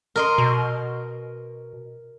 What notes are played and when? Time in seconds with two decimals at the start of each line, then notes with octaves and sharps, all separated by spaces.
0.16 A#4 D#5 C6
0.38 B2